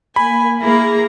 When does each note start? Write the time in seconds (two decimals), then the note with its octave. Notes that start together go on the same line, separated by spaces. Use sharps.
0.16 A#3 G#5 B5
0.61 A#3 E4 G#4 A#5